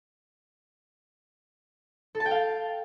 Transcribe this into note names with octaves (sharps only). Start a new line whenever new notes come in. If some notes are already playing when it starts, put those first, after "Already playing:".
A4
A5
G5
F5